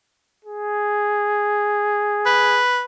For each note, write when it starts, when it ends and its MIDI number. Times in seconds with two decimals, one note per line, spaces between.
0.45 2.63 68
2.26 2.83 71